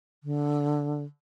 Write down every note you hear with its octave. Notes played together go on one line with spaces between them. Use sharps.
D3